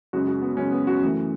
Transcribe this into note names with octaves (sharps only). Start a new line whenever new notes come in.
F#2 C#3 G#3 F#4
F#4
B3
F#2 C#3 G#3 C#4
B3
F#4
F#2 E3 A3